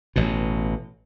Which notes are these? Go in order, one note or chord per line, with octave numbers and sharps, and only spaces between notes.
A1 B2